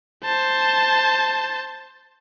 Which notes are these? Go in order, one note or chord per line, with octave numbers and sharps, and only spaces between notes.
C5 A5